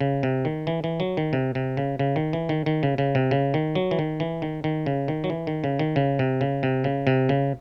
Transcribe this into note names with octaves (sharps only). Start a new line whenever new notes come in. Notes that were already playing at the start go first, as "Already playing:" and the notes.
C#3
C3
D#3
E3
E3
F#3
D#3
C3
C3
C#3
C#3
D#3
E3
D#3
D#3
C#3
C#3
C3
C#3
D#3
F#3
E3
D#3
E3
D#3
D#3
C#3
D#3
F#3
E3
D#3
C#3
D#3
C#3
C3
C#3
C3
C#3
C3
C#3